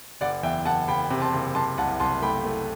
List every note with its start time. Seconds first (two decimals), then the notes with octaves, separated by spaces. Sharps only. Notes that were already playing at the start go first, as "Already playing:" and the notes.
0.21 F#1 D5 F#5
0.43 E2 E5 G5
0.65 F#1 F#5 A5
0.88 F#1 G5 B5
1.10 C3
1.22 A5 C6
1.33 F#1
1.55 C3 A5 C6
1.78 C2 F#5 A5
2.00 C2 A5 C6
2.22 A3 G5 B5
2.45 A3